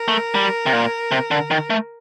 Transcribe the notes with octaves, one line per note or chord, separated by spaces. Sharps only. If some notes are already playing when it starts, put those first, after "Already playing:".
Already playing: A#4
A3
G3
C3
A#2
C3
D3
D#3
A3